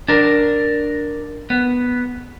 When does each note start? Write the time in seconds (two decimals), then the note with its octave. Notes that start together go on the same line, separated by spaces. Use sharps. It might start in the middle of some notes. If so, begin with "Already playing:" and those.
0.08 D4 A#4
1.50 B3